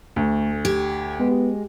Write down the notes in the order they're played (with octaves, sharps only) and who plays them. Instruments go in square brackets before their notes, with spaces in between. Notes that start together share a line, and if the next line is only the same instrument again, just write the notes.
[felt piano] D2 [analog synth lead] A3
[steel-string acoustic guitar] G4 [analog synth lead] G#6
[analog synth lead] G#3 [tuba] B3